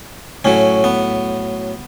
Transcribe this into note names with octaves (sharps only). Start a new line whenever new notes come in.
A2 F#3 C#4
B3